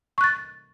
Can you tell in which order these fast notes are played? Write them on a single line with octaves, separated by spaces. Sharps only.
C#6 F#6 A6